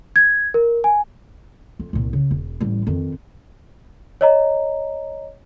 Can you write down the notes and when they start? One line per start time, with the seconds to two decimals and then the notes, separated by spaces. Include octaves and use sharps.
0.16 G#6
0.54 A#4
0.84 G#5
1.79 F2
1.93 C2 A#2
2.13 C#3
2.31 E1
2.60 A1 G3
2.87 F2 D#3
4.21 C#5 D#5 A#5